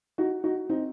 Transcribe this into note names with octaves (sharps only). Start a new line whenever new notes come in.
D#4 F#4
D#4 F#4
C4 D#4